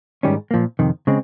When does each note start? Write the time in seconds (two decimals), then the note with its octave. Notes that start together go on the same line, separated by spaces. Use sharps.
0.23 G#2 D#3 G3 C#4
0.51 A#2 F3 A#3
0.79 F2 C3 D#3
1.07 C#3 G#3 C4